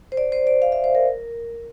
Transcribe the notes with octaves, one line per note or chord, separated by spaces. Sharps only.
C5
D5
C5
D5
F5
E5
C5
A#4